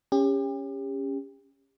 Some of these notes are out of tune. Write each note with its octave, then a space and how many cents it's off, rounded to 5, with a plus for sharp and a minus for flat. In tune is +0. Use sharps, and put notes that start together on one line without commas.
C#4 +0 G4 +35